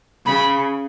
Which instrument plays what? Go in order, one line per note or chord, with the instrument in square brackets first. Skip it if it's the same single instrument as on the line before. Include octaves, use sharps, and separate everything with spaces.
[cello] C#3 [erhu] B5